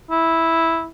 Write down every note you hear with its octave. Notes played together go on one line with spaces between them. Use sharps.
E4